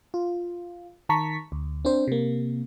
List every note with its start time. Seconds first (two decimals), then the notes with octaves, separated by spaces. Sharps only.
0.14 F4
1.09 D#3 A5 A#5 C#6 B6
1.52 D2
1.85 C4 D4 C5
2.08 C3 A#3